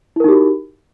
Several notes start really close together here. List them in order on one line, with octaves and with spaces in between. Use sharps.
E4 A#4 D#4 G4 F#4